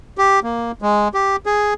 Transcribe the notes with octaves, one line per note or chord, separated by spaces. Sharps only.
G4
A#3
G#3
G4
G#4